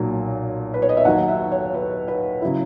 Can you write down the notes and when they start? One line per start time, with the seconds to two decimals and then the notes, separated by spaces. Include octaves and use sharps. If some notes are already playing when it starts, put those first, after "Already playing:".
Already playing: B1 A#2 F#3
0.74 B4
0.82 C#5
0.89 D#5
0.97 E5
1.05 D#2 D#3 F#3 F#5
1.28 E5
1.52 C#5
1.74 B4
2.08 B4
2.42 C#3 F#3 E4